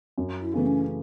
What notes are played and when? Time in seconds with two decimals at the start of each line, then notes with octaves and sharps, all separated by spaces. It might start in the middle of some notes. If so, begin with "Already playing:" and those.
0.18 F#2
0.41 E4
0.54 C#3 E3 A3 B3
0.66 C#4